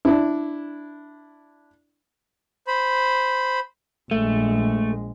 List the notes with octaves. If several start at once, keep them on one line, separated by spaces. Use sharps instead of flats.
D4 E4
C5 B5
A#1 G#3 A3